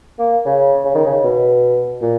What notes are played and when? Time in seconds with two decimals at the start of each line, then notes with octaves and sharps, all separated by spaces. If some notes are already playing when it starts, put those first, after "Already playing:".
0.19 A#3
0.46 C#3
0.85 C#3
0.95 D#3
1.06 C#3
1.24 B2
2.02 A#2